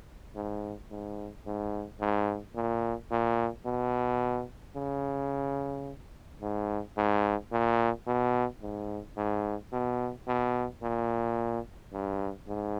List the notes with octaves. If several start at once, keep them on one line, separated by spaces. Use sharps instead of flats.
G#2
G#2
G#2
G#2
A#2
A#2
B2
C#3
G#2
G#2
A#2
B2
G#2
G#2
B2
B2
A#2
G2
G#2